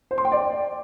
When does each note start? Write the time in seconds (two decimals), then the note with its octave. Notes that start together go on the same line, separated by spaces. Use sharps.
0.11 C5
0.18 C6
0.25 G5
0.32 D5